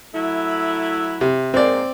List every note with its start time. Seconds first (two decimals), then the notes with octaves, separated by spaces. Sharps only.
0.14 F#3 A3 E4
1.21 C3
1.54 G#2 G#3 A#3 C4 D5